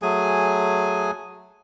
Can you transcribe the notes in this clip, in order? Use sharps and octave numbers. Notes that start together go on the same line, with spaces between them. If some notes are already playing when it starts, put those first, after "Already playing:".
F#3 A3 G#4 G#5